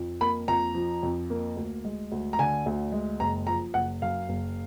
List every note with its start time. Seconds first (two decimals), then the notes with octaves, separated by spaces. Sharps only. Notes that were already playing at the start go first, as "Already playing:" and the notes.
Already playing: F2
0.21 A#3 B5
0.48 F2 A#5
0.75 F3
1.03 F2
1.30 A#3
1.57 D2
1.85 G#3
2.12 D2
2.33 A#5
2.39 D3 G#5
2.66 D2
2.92 G#3
3.20 F#1 A#5
3.47 F3 A#5
3.74 F#1 F#5
4.02 F#2 F5
4.29 F#1